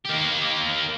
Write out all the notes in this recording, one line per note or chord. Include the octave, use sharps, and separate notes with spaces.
A#3 G4